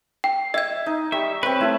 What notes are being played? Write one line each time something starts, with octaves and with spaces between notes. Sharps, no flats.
G5
D#5 E5 G#6
D#4
G3 E5 C#6
C4 B4 C#5 B6
A3 E4 A5